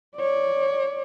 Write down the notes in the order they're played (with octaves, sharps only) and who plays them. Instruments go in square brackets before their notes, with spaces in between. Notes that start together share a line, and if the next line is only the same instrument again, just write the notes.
[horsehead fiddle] C#5 D5